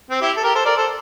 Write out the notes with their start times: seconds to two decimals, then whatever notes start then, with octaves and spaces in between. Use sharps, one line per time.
0.10 C4
0.21 E4 G4
0.37 A4
0.44 G4 A#4
0.55 A4 C5
0.65 A#4 D5
0.77 A4 C5